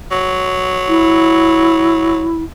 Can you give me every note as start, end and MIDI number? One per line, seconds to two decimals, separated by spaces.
0.11 2.27 54
0.88 2.43 64